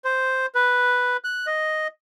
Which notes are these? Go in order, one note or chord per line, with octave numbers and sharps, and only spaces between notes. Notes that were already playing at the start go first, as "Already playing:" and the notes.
C5
B4
F#6
D#5